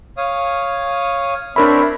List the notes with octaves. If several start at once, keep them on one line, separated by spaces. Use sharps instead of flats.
C#5 F5 D#6
C4 D4 A#4 C#5 E5 B5